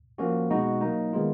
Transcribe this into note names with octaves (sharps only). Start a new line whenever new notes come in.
F3 A#3 C#4 F#4
B2 G#3 D#4 F#4
F#3 A#3 D#4
D#3 G#3 B3 F4